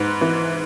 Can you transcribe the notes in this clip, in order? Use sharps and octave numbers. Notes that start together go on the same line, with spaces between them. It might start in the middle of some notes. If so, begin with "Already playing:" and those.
Already playing: G#2 B4
E3